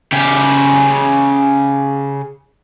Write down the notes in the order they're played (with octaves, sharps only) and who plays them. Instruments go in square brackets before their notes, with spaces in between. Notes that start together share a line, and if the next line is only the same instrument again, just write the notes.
[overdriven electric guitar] C#3 G4